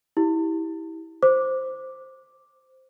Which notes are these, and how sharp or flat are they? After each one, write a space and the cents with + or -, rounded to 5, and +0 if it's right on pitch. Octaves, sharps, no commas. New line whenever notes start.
E4 -20 G4 +0
C5 +0 D6 +0